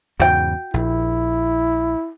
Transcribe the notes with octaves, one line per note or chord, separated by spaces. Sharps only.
E2 G#2 C#3 F#4 G5
A#1 E4